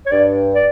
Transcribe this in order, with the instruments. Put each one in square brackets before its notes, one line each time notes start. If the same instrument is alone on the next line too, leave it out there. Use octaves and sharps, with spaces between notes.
[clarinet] C#5
[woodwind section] G2 [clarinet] D5
[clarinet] D5